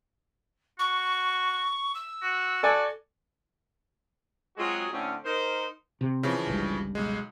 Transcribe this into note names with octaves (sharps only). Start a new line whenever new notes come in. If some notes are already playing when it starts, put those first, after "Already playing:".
F#4 C#6
E6
F#4
F#4 A4 D5 G#5
F#3 G#3 C4 F4 F#4 G#4
A2 D3 C4 C#4
D#4 A#4 C5
C3
C#3 E3 F3
G1 C#2 G2
B1 G#3